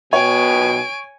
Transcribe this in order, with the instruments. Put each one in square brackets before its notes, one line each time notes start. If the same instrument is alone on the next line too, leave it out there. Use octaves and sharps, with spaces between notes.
[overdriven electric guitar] B1 G5 [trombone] B2 [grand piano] C#5 [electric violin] G#5 D7